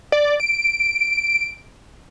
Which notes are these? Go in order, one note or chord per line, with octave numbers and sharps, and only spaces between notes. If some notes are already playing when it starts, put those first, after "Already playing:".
D5
D7